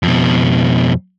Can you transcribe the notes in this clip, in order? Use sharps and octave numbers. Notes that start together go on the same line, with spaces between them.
F2 B2